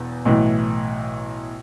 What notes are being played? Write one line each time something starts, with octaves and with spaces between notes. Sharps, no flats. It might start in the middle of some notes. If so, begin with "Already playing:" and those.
Already playing: E1 E2
B1 A2 E3